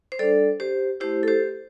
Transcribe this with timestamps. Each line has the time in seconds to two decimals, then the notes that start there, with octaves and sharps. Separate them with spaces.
0.12 C5
0.19 G3 D4 A4 D5
0.60 G4 C5
1.00 A3 E4 G4 C5
1.23 A4
1.28 G4 C5